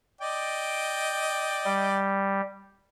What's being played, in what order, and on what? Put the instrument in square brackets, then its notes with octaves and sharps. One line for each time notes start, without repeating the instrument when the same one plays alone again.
[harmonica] D5 D#5 G5
[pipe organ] G3